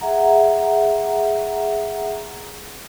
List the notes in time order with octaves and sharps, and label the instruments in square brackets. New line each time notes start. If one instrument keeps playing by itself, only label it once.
[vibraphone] G#4 E5 F#5 A#5